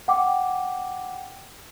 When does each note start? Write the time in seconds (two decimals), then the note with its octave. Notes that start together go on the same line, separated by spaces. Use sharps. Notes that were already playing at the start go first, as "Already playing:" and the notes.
0.08 F#5 G5 D6